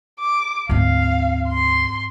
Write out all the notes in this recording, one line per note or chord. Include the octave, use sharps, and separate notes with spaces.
D6
D2 G#2 C4 F5
C6